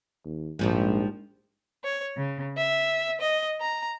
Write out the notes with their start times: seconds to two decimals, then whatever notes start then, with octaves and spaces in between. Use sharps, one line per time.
0.25 D#2
0.59 A#1 G#2 F3 G3
1.84 C#5
2.15 C#3
2.57 E5
3.22 D#5
3.60 A#5